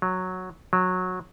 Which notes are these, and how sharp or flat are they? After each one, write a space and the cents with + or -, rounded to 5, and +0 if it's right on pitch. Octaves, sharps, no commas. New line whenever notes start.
F#3 -5
F#3 -15